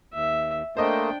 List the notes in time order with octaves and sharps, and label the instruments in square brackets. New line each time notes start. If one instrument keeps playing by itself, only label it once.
[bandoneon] D#2 [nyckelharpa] E5
[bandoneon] A3 A#3 [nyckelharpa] D4 G5 [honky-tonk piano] C5 D#5